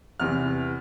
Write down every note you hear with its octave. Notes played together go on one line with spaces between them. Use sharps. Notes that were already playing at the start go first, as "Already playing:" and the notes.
E2 C3 E3 F6